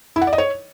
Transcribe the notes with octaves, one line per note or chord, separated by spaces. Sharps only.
E4
F#5
D5
D#5
C#5